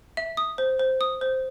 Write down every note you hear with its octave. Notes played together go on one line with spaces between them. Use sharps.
E5
D#6
C5
C5
D#6
C5